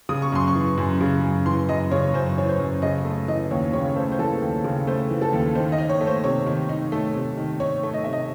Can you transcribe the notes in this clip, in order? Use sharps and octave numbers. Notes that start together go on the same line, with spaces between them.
C#3 D#6
C#6
F#2 C6
C#6
E3
F#2
C#3
F#2
E3 C6
F#2 D#5
C#3 C#5
F#2 C5
E3 C#5
C5
F#2
C#3 D#5
A3
E3 D#5
D#2 C#5
C#3 C#5
A3 C5
C5
E3 A4
D#2
C#3
A3 C5
E3
A4
D#2
D#3 C5
D#5
D#4
C#5
A3
C5
C3 C#5
D#3
D#4
A3
C3
D#3
D#4 C#5
A3
D#5
C3 E5
D#5